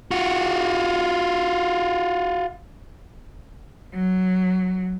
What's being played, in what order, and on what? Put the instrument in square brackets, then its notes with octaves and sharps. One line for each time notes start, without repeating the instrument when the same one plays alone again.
[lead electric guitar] F4 F#4
[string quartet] F#3